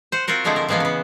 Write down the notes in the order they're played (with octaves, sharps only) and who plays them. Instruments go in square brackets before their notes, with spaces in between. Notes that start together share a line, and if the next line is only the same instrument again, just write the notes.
[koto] C5 F#5
C4 F4 F#4 A#4 C5
D3 F3 G#3 A3 C4 E4
A#4
E3 F3 G#3 A#3 B3
C#3 B3